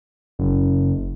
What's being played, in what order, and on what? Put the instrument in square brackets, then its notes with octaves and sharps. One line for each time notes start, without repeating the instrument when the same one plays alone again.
[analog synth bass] F#1